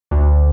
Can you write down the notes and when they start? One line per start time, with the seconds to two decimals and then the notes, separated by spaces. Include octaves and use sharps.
0.11 D2